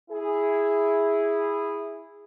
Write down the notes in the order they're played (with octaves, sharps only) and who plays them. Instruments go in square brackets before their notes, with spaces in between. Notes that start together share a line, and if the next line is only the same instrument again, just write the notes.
[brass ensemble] E4 G#4